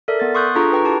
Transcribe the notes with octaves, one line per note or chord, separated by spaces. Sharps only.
A4 A#4 D5 E5
B3 A6
C6 C#6 D#6 F#6 G6
D4 F4 G#4 A4 A#5 C#6
B4 G5 A#5
E4 G4 A5